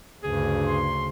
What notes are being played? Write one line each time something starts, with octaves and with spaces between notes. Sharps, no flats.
D2 G2 C#3 G#4
C6